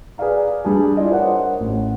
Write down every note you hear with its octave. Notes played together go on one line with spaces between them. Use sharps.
G#4 B4 D5 F5 A#5
G3 D4 G#4 A5
E4 F4 D5 D#5
A#4 C5 C#5 F#5
A1